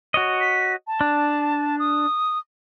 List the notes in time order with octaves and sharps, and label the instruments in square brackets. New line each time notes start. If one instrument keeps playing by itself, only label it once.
[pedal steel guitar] F#4 C#5 D#5
[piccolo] B6
A5
[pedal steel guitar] D4
[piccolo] D#6